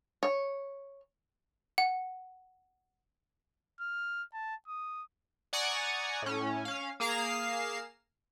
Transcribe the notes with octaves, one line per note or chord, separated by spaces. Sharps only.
C#5
F#5
F6
A5
D#6
D5 F#5 G#5 A#5 C#6 D#6
A2 C#4
C#4 F5
A#3 G#4 F5 A#5 C7 E7